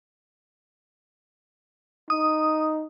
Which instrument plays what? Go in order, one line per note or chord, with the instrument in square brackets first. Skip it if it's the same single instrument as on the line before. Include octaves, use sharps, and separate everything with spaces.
[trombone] D#4 [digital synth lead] D#6